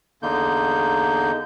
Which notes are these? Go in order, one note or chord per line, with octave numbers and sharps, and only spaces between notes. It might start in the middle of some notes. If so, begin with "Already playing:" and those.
E2 D3 A#3 D#4 G6